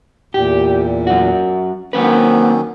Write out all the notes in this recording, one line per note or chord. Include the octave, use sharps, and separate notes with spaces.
E2 A#2 G4
F#2 F#4
D#3 F#3 A#3 C4 C#4 B4